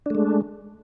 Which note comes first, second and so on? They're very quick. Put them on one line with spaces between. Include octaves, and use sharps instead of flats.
D4 A3 G#3